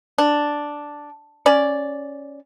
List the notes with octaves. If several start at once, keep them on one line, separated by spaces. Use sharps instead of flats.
D4
C#4 D5